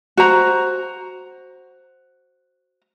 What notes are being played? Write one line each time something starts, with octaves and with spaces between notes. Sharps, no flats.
F#4 C5 A#5